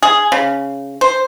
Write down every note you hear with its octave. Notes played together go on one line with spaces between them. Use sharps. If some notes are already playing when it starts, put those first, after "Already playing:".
G#4
C#3
C5